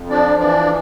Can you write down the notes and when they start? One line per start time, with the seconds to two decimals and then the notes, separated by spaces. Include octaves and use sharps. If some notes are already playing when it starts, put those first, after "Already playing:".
Already playing: F2
0.10 F3 D4 D5
0.38 E3 D4 D5